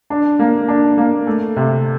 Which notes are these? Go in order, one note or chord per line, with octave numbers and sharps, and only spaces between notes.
D4
A#3
D4
A#3
A3
C3